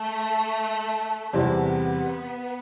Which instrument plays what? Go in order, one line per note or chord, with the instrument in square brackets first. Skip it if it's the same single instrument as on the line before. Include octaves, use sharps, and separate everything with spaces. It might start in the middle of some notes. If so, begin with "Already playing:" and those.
Already playing: [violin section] A3
[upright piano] E2 C3 G3 C4 [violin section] B3